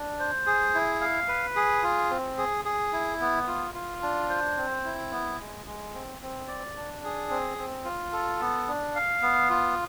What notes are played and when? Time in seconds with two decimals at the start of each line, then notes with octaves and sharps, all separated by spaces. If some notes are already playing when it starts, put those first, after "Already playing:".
Already playing: D4
0.19 C5
0.47 G#4
0.74 E4
1.01 F5
1.28 B4
1.56 G#4
1.83 F4
2.10 C4
2.38 G#4
2.65 G#4
2.93 E4
3.20 B3
3.47 F4
3.74 F4
4.02 D4
4.29 C5
4.57 C4
4.84 E4
5.11 B3
5.39 G#3
5.67 G#3
5.94 C4
6.21 C4
6.48 D5
6.76 D4
7.04 G#4
7.30 C4
7.58 C4
7.85 F4
8.13 A4
8.41 B3
8.67 D4
8.95 F5
9.22 B3
9.50 F4